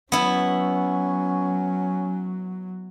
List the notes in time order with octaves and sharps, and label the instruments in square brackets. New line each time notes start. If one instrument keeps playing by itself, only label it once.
[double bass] F#3 [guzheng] B3 E4 [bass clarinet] C#4